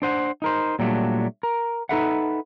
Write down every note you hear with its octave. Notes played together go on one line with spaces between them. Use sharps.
D4 C5 F#5
D#4 A#4 C5
A#2 F#3 G3 A3 D4
A#4
D#4 F#4 A4 B4 E5 F#5